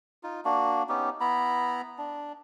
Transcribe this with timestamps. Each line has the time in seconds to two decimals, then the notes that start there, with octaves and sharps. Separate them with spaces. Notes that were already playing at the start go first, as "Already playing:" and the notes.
0.23 D#4 F4
0.45 A#3 D4 F#4
0.89 B3 C#4 D#4 G4
1.20 B3 E4 A#5 B5
1.98 D4